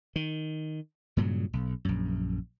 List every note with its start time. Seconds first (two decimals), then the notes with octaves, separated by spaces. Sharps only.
0.16 D#3
1.17 G2 A#2 C#3 F#3
1.53 B1
1.85 A#1 F#2